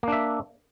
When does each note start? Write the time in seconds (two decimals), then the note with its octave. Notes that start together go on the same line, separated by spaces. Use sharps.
0.03 A#3
0.08 D4
0.12 E5